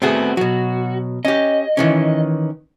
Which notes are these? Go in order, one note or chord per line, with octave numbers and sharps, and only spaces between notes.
A3 B3 C4 F#4 G#4
B2 F#3 F#4
C#4 G4 D#5
D#3 E3 C#4